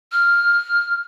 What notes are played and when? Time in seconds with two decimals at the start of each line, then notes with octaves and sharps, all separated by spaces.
0.12 F6